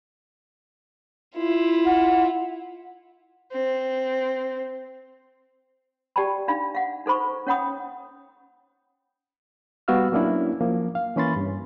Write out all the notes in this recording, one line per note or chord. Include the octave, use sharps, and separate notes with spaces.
E4 F4
F#5
C4
G4 D5 G5 A5 B5
D4 D#4 F5 B5
F5 F#5
D#4 A4 C5 B5 C#6
C#4 C#5 F#5 G5 B5 D#6
G3 B3 F#4 F5 E6 F6
F#3 A#3 C#4 D4 E4
F3 A#3
F5
E3 A#3 C#4 B5 C6 A6
G2